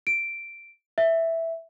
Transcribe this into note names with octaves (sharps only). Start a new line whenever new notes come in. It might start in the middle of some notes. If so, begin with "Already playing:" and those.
D7
E5